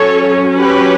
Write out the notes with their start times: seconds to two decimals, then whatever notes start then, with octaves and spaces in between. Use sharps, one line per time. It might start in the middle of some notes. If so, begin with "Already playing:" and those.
Already playing: F#3 C#4 A4 C#5
0.58 G4 B4